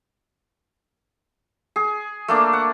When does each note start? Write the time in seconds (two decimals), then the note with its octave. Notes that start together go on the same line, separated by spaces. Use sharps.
1.76 G#4
2.28 A3 A#3 D4
2.53 F#5